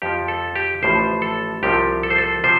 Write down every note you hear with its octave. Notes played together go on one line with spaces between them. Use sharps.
F2 F3 G4
A4
G4
A1 A2 F3 C5
A4
C2 C3 F3 G4
A4
C5
A4
C3 F3 C5